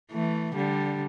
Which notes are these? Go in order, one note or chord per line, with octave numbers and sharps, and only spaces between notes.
E3 A3
D3 G3